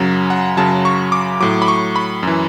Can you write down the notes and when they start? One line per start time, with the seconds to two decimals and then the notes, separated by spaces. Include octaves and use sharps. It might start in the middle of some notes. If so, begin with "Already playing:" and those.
Already playing: F#2 C#3 F#3
0.30 F#5
0.57 F#2 C#3 F#3 A5
0.85 C#6
1.12 D6
1.40 A2 F#3 D6
1.62 B5
1.68 C#6
1.96 B5
2.23 F#2 E3